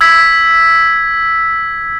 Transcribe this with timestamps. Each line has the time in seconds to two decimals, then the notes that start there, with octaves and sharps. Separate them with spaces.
0.01 E6 G#6 B6